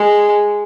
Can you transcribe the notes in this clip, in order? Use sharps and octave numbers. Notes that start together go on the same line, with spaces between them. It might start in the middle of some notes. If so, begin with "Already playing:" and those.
Already playing: G#3